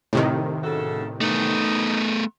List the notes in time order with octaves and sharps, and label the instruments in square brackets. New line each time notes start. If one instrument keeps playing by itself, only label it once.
[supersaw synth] A2 C3 D#3
[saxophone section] C#3 F#4 A4
[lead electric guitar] A3 B3 [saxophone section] D#4